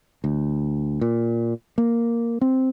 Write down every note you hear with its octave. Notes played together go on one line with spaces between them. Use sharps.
D2
A#2
A#3
C4